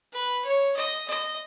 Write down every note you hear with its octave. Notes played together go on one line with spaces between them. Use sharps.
B4
C#5
D#5
D#5